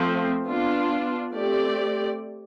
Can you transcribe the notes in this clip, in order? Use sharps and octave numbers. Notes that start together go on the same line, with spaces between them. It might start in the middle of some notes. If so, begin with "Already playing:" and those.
Already playing: F3 A3 C4
B3 D4 F4
A3 C4 G4 D5